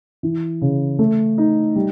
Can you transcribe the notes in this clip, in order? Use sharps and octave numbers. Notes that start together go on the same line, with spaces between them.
E3
C#3
A3
D#4
G3